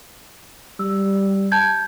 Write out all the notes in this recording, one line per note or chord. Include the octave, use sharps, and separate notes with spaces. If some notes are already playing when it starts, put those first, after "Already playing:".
G3 E6
A5 G6 G#6